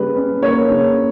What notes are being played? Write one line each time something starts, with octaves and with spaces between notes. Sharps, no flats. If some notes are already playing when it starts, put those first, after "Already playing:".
Already playing: C#3 G3 A#3 B4
C#4
A#3 C#5
C#3